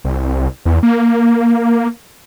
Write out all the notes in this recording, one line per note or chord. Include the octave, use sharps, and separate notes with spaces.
C2
E2
A#3